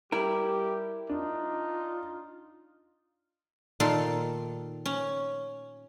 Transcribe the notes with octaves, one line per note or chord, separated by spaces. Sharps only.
G3 E4 G4 A#4
D4 D#4 F4
A#2 D#3 A4 F5 C6
C#4